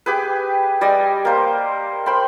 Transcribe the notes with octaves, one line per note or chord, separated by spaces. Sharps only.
G4 G#4 B4
G3 D5 D#5 G#5
A#3 C5
C5 G5 B5 C6